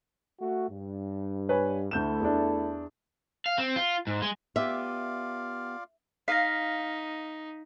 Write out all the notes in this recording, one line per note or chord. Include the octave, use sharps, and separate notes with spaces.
A3 F#4
G2
B4 C#5 G#5
D2 A3 E4 A4 G6 E7
E2 D4
F5
C4
F4
G#2
G#3
B3 F4 G4 D5 E5 F5
D#4 F5 A#6 B6